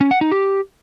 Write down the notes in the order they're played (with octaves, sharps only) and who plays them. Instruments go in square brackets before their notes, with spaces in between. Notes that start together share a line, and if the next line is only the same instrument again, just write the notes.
[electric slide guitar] C#4
F#5
D#4
G4